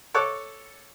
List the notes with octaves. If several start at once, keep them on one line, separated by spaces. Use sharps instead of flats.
A4 C#5 D6 F#6